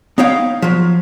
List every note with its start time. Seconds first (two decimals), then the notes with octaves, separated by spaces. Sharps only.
0.18 B3 D#4 C#5 F5 G5
0.62 F3 F#3